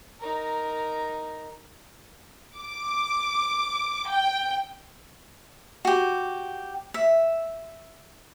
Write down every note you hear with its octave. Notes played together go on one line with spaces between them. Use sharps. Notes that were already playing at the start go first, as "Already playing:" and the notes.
D#4 A#4
D6
G5
F#4 G4
E5